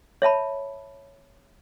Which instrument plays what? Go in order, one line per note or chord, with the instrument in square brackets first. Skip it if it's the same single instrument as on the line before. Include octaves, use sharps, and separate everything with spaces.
[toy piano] C#5 E5 A5 B5